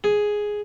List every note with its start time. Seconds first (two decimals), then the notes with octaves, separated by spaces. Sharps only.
0.04 G#4